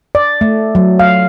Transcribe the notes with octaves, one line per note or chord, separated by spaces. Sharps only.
D5
A3
F#3
F5